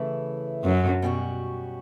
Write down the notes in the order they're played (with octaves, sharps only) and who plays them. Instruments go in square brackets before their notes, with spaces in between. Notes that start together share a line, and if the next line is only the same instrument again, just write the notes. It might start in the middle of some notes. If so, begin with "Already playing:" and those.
Already playing: [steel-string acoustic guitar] C#3 E3 A3 E4
[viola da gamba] F#2
[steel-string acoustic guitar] B2 G3 C#4 F#4